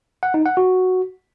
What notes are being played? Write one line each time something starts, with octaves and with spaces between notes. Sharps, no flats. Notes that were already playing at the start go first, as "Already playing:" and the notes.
F#5
D#4
F#5
F#4